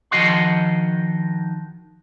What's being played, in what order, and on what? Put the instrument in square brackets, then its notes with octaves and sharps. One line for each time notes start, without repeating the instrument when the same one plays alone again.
[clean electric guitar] D#3 F3 F#4 D#5 F#5 C6